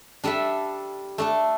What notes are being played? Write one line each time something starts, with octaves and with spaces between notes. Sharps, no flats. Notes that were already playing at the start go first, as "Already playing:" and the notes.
G3 D4 A4 E5
A3 D4 A4